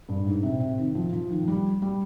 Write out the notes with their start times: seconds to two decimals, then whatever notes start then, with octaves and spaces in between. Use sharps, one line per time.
0.09 G2
0.26 G#2
0.43 C3
0.60 C3
0.78 D#3
0.95 F3
1.13 F3
1.30 D#3
1.42 F3
1.48 G3
1.82 G3